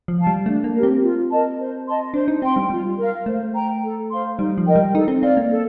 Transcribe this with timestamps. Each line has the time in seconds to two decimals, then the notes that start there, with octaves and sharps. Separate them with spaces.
0.08 F3
0.18 F5 A5
0.27 G3
0.46 A3 D4
0.64 A#3
0.73 G4 A#4
0.83 C4
1.02 F4
1.30 A#4 D#5 A5
1.58 C5
1.86 D#5 A5 C6
2.14 D4 C5
2.28 D#4
2.42 C4 G5 C6
2.56 G3
2.70 G3 F4
2.98 A#4 F5
3.26 A3 C5
3.55 G5 A#5
3.83 A4
4.11 C5 F5 C6
4.39 G3 D#4
4.58 F3
4.67 A#4 D#5 G5
4.76 G3
4.95 D#4 A4
5.08 C4
5.22 C4 D5 F5
5.37 A#3
5.50 A4